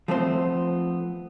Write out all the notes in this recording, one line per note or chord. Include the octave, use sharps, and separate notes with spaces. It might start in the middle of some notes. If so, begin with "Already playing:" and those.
F3 A3 B3 C4 C5